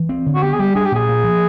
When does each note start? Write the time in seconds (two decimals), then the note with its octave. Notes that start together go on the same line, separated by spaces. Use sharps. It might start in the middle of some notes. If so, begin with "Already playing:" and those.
Already playing: E3
0.09 C4
0.26 D3
0.35 F#4
0.43 B3 G4
0.53 G#4
0.59 G3 G4
0.75 D4 G#4
0.85 G4
0.92 A#2 G#4
1.09 A#3
1.24 F3